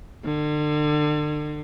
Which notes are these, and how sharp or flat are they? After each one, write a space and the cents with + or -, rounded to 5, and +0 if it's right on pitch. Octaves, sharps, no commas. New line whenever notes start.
D3 +35